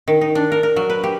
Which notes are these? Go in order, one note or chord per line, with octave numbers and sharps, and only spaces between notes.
D#3
D#4
D4
A#4
A#4
F#3
B4
G4